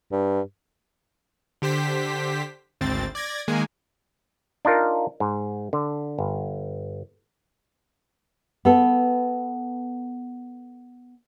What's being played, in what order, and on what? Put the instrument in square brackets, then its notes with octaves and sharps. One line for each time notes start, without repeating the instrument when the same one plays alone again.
[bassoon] G2
[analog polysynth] D3 G4 C5 B6
G#1 D2 C4 A6
D5 G#6 A#6
D#3 G#3 A#3 G#5
[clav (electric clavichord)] D4 D#4 F4 A#4
G#2
D3
G1
[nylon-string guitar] B3 A4